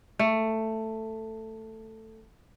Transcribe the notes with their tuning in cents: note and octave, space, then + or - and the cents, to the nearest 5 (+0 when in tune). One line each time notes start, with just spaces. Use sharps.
A3 +10